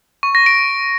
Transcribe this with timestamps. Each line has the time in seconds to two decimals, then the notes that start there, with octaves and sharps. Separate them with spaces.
0.23 C#6
0.35 A#6
0.46 D7